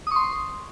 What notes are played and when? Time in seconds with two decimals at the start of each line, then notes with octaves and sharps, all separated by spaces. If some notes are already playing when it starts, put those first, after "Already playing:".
0.07 D#6
0.11 C#6
0.16 C6